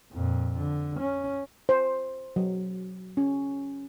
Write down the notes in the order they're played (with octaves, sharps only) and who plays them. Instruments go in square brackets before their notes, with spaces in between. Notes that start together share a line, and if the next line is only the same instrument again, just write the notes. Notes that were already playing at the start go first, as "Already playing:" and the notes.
[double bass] F2 A#2
D3
C#4
[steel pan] C5
F#3
C#4